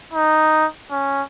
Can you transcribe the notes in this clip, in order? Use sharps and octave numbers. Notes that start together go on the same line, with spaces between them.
D#4
C#4